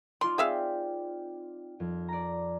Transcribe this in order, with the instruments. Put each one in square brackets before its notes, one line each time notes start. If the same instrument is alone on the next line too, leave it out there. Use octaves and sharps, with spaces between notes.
[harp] D#4 F4 D5 [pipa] C6
[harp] C4 G5 [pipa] G#4 E5 F5
[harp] F2
D5 A#5